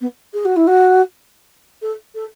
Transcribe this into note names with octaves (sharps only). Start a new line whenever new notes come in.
B3
G#4
F#4
E4
F#4
A4
A4